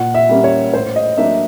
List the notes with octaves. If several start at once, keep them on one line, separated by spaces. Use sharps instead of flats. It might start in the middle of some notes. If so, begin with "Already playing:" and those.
Already playing: A#2 F#5
E5
G3 A#3 C#4
C#5
A2 C5
D#5
F#3 A#3 D4 E5